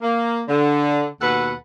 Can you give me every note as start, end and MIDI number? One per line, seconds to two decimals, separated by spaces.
0.02 0.43 58
0.48 1.08 50
1.22 1.54 39
1.22 1.54 47
1.22 1.54 69
1.22 1.54 71
1.22 1.54 78